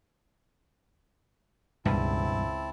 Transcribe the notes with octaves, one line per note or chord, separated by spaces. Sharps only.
C#2 G2 B2 E3 C4 E4 A5